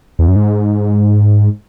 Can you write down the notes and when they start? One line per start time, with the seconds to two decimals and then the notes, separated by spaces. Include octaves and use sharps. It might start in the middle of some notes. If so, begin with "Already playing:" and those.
0.19 E2
0.28 F#2
0.36 G#2